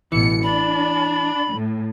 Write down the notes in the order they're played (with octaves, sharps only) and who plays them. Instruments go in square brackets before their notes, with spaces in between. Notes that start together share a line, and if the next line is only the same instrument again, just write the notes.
[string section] A1 B2 C#7 [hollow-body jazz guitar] E3
[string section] D4 [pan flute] B5
[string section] A2